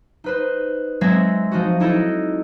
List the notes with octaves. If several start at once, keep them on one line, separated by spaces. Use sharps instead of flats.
D#4 B4 C5
F#3 G#3 C4 E5 G#6 A#6
F3 D#4 F#4
D#4 E4 A4 D#5